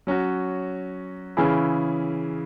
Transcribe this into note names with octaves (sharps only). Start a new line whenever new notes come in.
F#3 C#4 F#4
C#3 E3 C#4 E4 G#4